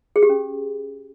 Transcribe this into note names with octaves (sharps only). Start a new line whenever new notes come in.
G#4
G4
C#4